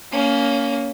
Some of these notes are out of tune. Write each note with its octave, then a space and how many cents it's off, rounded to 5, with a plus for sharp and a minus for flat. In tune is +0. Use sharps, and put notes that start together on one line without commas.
A#3 +0 C#4 +25